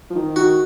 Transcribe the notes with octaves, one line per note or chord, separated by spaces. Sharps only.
F3
D#3
D#3 F#4